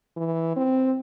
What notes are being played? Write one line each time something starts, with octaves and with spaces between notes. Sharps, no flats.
E3
C4